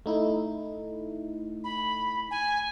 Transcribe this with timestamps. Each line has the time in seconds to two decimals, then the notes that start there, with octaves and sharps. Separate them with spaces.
0.06 A3 D#4 E4
1.64 B5
2.31 G#5